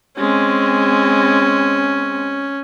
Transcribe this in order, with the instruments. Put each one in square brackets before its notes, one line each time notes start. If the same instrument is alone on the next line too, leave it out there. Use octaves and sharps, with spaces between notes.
[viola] G#3 C4 [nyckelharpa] C#4